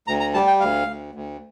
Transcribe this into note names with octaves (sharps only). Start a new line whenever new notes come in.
D2 A#5
A#5
G3 A5
G5
D2 F5
D2
D2